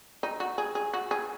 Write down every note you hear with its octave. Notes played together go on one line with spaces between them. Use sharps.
D#4
F#4
G#4
G#4
F#4
G#4